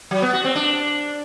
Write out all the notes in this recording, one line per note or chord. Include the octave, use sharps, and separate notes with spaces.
F#3
B3
F#4
C4
D4